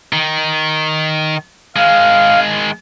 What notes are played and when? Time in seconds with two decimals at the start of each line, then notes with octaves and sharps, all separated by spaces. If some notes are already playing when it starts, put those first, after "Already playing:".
0.13 D#3
1.76 D#3 G#3 F5